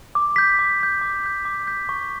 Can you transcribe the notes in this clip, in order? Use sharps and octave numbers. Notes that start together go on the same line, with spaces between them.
D6
G6 B6
D6
G6 B6
D6
G6 B6
D6
G6 B6
C#6